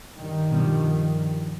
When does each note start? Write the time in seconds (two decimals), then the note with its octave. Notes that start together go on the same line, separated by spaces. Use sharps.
0.17 G2 D#3
0.51 B2 F3 G3